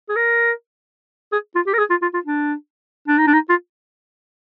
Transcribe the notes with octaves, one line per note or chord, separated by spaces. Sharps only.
G#4
A#4
G#4
F4
G4
A#4
G#4
F4
F4
F4
D4
D4
D#4
D4
D#4
F4